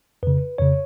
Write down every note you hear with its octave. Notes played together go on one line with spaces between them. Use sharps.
F2 C#3 B4
F2 C#3 C#5